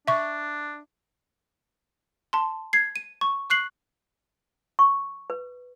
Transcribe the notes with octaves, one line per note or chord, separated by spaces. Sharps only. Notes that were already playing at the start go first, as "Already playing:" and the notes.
D4 E5 C#6
A5 C6
G#6 C7
D#7
C#6
C#6 F#6 C7 F#7
C#6
B4